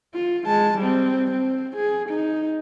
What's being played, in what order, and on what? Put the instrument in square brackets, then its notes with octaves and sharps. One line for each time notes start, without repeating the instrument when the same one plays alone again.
[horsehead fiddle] F4
G#3 A5
G3 C4
C4
G#4
D#4